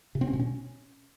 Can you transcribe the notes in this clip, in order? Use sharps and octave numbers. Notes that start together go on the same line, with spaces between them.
C3
C4
C#4
B2
C#4